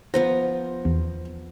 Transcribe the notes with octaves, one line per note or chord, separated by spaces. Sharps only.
F3 B3 C5 A#5
E2